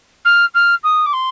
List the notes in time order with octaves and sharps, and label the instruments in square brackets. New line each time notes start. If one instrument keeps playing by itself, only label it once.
[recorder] F6
F6
D#6
D6
C6